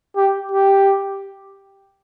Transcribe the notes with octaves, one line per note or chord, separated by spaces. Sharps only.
G4
G4